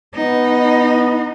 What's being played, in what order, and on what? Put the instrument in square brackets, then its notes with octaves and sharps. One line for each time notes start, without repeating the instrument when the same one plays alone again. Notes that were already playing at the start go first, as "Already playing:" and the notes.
[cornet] B3 [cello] D#4